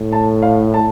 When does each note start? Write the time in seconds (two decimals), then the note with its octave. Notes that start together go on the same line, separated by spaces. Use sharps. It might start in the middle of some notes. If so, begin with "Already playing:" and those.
Already playing: A2
0.12 A5
0.42 F5
0.74 A5